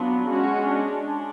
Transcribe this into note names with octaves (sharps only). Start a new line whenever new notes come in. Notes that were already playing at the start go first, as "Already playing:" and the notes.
Already playing: F#3 B3 D4 F4
G#3 C#4 F#4
D4
D4